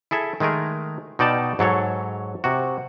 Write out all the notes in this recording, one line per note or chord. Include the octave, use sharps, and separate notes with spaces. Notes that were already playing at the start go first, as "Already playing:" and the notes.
E4 G#4 A4 E5
D#3 G#3 A3 G#4 A#4
B2 D#4 D5 G5 A5
G#2 F#3 A4 C#5
C3 F#4